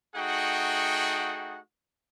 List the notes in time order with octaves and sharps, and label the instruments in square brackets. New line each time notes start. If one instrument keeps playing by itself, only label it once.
[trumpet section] A3 D#4 F#4 G#4 F#5 G5